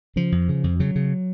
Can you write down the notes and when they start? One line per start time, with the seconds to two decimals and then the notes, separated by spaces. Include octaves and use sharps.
0.16 C#3 F3
0.32 F2
0.49 C#3
0.64 F2
0.80 C#3 F#3
0.96 C#3